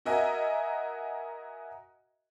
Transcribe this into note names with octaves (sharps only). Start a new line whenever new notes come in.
F#4 A#4 D#5 E5 G#5